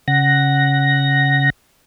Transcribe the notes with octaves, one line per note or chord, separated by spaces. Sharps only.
C#3 F#5 A#6